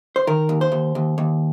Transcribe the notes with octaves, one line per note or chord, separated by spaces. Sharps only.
C5
D#3 A#4
D#2
C5
D#2
D#2
D#2